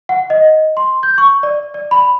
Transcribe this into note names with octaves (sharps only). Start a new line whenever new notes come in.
F#5
D#5
C6
G6
C#6
D5
D5
B5